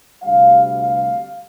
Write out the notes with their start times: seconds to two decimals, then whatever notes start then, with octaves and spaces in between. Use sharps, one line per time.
0.22 D2 C3 G3 F5
0.77 F5